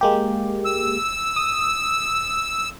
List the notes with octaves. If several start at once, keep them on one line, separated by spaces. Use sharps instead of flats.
G#3 A#3 G4
E6
D#6